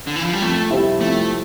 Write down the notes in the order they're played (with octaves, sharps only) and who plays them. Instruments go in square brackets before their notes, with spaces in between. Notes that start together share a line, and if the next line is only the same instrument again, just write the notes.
[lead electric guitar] D3
E3
F3
G3
[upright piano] F2 [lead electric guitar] A3
[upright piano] C3 G3 C4 E4
[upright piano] F2 [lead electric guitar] A3